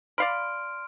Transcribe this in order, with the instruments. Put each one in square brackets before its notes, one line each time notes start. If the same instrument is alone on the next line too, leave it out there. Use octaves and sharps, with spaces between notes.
[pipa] D5 F5 B5 [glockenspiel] C6 F6 D7